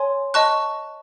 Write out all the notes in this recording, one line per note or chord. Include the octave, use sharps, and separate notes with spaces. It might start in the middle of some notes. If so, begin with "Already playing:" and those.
Already playing: C#5 G#5 C6
D#5 A5 C#6 F#6